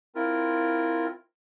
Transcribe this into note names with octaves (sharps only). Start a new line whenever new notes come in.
C4 E4 F4 A#4